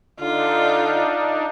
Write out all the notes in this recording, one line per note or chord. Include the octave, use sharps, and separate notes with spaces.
D3 D4 D#4 F4